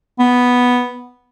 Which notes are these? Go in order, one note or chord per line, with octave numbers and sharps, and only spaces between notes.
B3